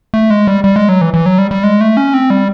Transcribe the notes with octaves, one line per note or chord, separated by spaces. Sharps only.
A3
G#3
G3
G3
G#3
F#3
E3
E3
F#3
G3
G3
G#3
A3
C#4
C4
G3